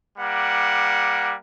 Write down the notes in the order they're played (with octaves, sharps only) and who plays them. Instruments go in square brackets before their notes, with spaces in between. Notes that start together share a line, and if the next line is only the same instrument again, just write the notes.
[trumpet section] G3 A#3 F#5